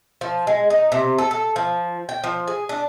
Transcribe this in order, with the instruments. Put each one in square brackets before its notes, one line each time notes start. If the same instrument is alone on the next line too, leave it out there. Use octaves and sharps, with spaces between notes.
[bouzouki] F3
G#3
D#4
C3
A4
A4
F3
G5
F3
G#4
D4